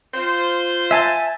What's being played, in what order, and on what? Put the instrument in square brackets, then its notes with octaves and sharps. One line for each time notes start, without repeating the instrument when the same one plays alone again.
[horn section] F4 C5
[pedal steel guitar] E5 G#5 A5